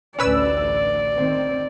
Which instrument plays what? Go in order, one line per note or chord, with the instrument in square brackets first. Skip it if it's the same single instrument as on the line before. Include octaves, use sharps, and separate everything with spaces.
[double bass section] A1 D2 [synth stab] C#4 B4 E6 [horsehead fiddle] D5
[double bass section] D#3 C4